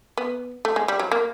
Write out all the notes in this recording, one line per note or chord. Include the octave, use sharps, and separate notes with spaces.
B3
A3
G#3
G3
F#3
A#3